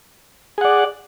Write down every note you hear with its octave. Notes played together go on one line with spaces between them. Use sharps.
G#4 D5 F#5